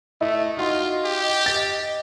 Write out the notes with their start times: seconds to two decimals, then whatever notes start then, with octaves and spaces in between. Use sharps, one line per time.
0.21 A3 E4 D#5
0.57 D#4 F4 F#4 C6
1.05 G4
1.46 A6